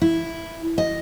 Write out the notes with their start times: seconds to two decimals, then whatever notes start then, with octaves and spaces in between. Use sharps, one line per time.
0.02 E4
0.78 D#5